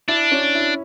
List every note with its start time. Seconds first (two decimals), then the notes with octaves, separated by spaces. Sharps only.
0.08 D4 E4
0.32 C#4
0.55 E4